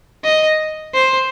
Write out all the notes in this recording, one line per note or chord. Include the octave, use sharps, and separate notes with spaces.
D#5
C5